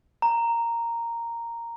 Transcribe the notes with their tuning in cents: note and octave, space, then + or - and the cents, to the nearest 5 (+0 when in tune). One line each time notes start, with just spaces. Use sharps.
A#5 -5